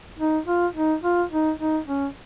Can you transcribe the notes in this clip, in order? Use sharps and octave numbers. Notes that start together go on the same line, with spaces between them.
D#4
F4
D#4
F4
D#4
D#4
C#4